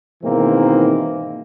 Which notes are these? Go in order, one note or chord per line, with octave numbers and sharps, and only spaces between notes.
G#2 B2 D#3 E3 A#3 C4